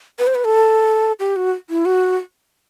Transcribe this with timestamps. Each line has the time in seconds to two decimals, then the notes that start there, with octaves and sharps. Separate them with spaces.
0.19 B4
0.27 C5
0.35 B4
0.45 A4
1.20 G4
1.36 F#4
1.70 E4
1.86 F#4